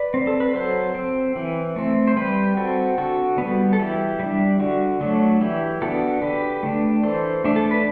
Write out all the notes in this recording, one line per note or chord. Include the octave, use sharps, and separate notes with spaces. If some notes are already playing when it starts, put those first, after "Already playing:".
Already playing: B4 D5
C4
A4
B4
F#3 A4 C5
C4
E3
A3 C4
C5
G3 G4 B4
C4 F#4 A4
D3 F#4 A4
G3 B3
A4
E3 E4 G4
G3 D4
D3 F#4
F#3 A3 D4
E3 E4 G4
B3 D4 F#4 A4
D3 G4 B4
A3 D4
E3 A4 C5
A3 D4
A4
B4